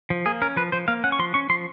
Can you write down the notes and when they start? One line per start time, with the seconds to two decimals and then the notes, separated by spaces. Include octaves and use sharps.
0.10 F3
0.26 A#3 G#4
0.42 C#4 A#4
0.57 F3 B4
0.72 F3 C5
0.88 A#3 F5
1.04 C#4 F#5
1.12 C#6
1.19 F3 C6
1.34 C#4 C#6
1.49 F3 C6